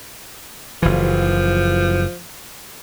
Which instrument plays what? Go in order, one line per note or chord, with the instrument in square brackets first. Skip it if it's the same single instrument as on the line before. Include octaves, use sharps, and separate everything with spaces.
[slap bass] F#1 E3 [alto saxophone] F3